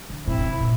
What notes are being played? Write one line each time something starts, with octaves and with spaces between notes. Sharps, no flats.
D3
A2 C4 E4
D3
C3
A#2